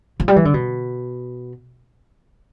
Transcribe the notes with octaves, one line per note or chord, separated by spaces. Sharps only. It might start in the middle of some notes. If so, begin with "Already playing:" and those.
F3
G3
E3
D3
B2